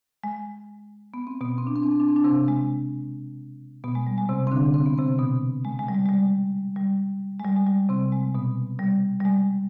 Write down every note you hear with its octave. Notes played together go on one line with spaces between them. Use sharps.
G#3
B3
C4
B2 B3
C4
D4
C4
D4
C4
D4
C4
D4
C3 C4
G#3
B2 B3
G#3
G3
G#3
C3 C4
C4
D3 D4
C4
B3
C3 C4
B2 B3
G#3
G#3
G3
G#3
G#3
G3
G3
G#3
G3
G#3
G3
C3 C4
G#3
B2 B3
G3
G3
G#3